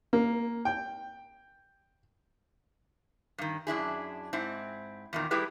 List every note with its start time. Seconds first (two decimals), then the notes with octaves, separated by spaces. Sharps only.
0.13 A#3
0.65 G5
3.38 G2 D#3
3.67 F#2 D4 E4 G#4
4.33 G#2 C4 E4
5.13 E2 A#2 D#3
5.31 G3 A3 E4 G4 G#4 B4